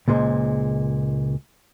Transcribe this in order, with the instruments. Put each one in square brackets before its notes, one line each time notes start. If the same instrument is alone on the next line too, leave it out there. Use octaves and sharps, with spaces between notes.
[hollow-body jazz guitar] C#2 A#2 G#3 C5